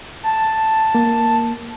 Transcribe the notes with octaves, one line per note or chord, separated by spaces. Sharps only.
A5
A#3